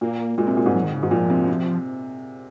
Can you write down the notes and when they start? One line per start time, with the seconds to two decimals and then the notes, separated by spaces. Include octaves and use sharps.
0.01 A#2 A#3
0.38 A#2 G#3
0.47 C3
0.57 A#2
0.66 G#2
0.75 F#3
0.84 D#3
0.93 C#3
1.02 G#2 D#3
1.11 A#2 F3
1.30 C3
1.48 C3